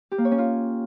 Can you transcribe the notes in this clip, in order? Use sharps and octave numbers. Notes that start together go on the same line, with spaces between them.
G4
A#3
C#5
C#4
F4